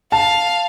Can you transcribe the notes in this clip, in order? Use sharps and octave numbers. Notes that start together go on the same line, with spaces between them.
F5 A5